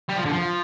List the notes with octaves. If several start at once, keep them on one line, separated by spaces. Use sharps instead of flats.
G3
F3
D3
F3